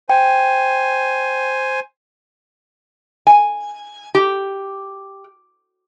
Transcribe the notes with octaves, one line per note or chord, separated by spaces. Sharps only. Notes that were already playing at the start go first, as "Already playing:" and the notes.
C5 G5 G#5
G#5
G4